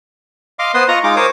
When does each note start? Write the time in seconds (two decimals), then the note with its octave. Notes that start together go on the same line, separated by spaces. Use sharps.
0.59 D#5 F5 C6 D6
0.74 B3 B4 C5 C6 D#6
0.88 F4 D#5 A#5 C#6
1.04 G#3 D#4 F4 D6
1.16 A#4 C5 C#5 D6 D#6